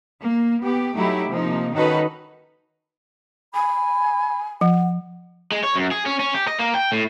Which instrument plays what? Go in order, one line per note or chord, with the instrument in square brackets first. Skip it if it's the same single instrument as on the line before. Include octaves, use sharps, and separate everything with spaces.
[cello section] A#3
B3 G4
F#3 A3 D#4 E4 G4
C3 F3 A#3 D#4
D#3 C#4 D#4 F#4 A4 B4
[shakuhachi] G#5 [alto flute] B5
[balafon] F3 [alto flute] F#5
[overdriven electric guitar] G#3
C#5
F#2
G#4
C#4
C#4
G4
D#5
A#3
G5
A2